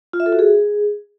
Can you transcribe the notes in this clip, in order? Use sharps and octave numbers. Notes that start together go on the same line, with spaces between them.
F4
E5
A4
F#4
G#4